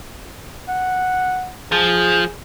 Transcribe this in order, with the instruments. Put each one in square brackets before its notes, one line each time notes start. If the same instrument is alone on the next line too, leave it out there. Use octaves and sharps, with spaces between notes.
[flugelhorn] F#5
[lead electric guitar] F3 [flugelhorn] G#4